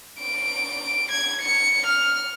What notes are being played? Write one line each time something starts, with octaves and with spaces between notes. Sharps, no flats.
D7
G#6
C#7
F6